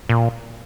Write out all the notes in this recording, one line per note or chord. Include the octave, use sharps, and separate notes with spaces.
A#2